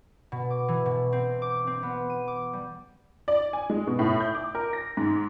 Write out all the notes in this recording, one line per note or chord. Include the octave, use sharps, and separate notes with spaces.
B2
D6
E3
B2
C4
D6
C4
B3
D#7
D6
G3
D5
G#5
G#3
B2
A2
G6
D6
A#4
A#6
G#2